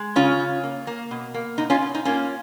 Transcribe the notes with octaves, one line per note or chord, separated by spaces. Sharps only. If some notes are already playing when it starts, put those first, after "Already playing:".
Already playing: G#3
C#3 C#4 F4
C#3
A#3
A#3
B2
A#3
B2 D#4
C#4 F4
B2
D#4
A#3 C#4 F4